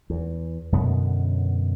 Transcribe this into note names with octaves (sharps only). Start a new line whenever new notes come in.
E2
F#2 B2 D3 B3